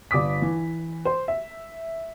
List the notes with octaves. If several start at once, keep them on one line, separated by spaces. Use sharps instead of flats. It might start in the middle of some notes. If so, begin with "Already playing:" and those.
G1 D5 D6 D#6 B6
E3
C5
E5